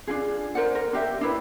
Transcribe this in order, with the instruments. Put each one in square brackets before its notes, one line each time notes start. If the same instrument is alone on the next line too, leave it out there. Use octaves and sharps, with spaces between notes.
[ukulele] D4 D#4 F4 G#4
A#4 C5 D5 F#5
A#4
D4 G4 E5
D4 E4 B4